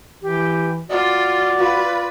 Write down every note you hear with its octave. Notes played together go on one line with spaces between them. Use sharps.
E3 G4
F4 F#4 D5
F4 B4